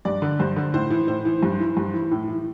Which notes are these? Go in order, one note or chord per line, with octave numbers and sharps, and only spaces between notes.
G2 D5
D3
G2 C5
D3
A2 C5
E3
A2 C5
E3
G2
E3
G2
E3
A2
E3